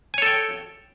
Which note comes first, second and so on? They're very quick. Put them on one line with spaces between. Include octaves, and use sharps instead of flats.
G#5 C#5 A4 G5